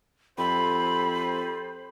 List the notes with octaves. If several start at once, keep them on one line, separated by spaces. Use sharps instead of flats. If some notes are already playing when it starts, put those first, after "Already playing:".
F2 G4 A4 C5 B5